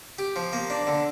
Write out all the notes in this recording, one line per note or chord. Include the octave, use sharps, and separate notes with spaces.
G4
F3
A#3
D4
D3